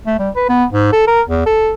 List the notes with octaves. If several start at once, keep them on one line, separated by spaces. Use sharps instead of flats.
A3
G3
B4
B3
G#2
A4
A#4
E2
A4